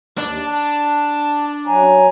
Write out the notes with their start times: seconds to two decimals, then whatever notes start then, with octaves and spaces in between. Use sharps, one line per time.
0.18 D#2 D4
0.46 A5
1.67 F#3 G#5 A#5